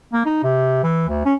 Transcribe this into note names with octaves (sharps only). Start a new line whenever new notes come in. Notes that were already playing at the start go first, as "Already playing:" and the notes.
A#3
D#4
C3
E3
D2
C#4